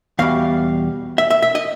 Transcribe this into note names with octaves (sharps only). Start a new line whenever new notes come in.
E2 B2 G3 F5
E5
E5
E5
D#5